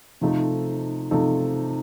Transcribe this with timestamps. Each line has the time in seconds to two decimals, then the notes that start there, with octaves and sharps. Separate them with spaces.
0.21 C3 F3 A3 D#4 A4
1.11 C3 F3 A3 D#4 A4